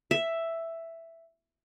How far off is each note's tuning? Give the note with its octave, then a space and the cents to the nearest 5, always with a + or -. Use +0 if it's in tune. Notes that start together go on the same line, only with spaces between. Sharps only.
E5 +5